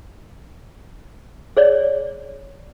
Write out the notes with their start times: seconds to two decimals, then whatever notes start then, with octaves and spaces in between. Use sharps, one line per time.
1.57 G#4 C#5 D5